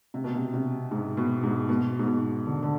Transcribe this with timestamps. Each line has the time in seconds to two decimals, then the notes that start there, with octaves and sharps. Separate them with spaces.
0.14 C3
0.24 B2
0.34 C3
0.54 C3
0.91 G#2
1.17 B2
1.43 G#2
1.69 B2
1.99 G#2
2.07 B2
2.46 D3
2.62 D3